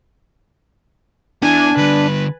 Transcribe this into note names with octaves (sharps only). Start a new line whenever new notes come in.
B3 D4 E4 G#5
D3 G3 B4